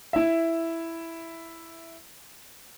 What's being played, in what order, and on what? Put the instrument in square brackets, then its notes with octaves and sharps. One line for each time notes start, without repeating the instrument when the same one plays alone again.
[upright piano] E4 E5